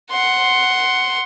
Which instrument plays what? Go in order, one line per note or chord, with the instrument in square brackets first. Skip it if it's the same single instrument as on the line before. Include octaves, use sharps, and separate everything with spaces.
[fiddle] F#5 C6